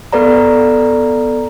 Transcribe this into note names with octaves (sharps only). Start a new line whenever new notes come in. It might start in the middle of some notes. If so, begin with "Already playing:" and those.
B3 A4 B4 D5 A#5